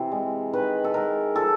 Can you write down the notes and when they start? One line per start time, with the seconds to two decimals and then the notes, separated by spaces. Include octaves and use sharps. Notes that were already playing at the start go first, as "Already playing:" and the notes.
Already playing: C3 E3
0.12 G#3
0.53 D#3 B4
0.84 A4
0.94 G#3 A#4
1.36 F3 A4